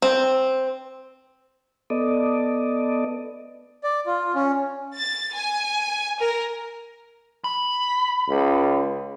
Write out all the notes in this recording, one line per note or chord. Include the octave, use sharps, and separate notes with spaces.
C4
B3 A4 D5 D#5
D5
F4
C#4
A6
G#5
A#4
B5
C#2